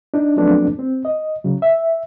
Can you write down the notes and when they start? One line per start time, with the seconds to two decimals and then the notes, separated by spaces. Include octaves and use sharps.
0.14 D4 D#4
0.36 F3 F#3 A3 B3 C4 D4
0.79 C4
1.05 D#5
1.45 C#3 F#3
1.62 E5